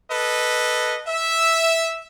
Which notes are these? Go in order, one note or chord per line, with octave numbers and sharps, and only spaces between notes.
A4 B4 D#5
E5